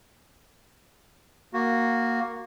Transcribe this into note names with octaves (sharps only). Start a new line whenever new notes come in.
A#3 F#4